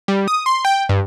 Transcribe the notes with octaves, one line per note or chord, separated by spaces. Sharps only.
G3
D#6
C6
G5
G2